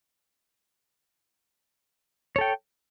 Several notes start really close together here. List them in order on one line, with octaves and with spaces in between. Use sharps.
C#5 A4 G5